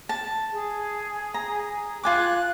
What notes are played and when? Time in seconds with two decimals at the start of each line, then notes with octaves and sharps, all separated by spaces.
0.09 A5
0.53 G#4
1.34 A#5
2.03 F4 G#5 D6 F#6